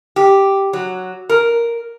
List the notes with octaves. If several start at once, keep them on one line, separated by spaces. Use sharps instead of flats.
G4
F#3
A#4